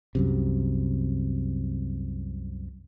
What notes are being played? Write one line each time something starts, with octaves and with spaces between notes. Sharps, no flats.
C2 F#2 C3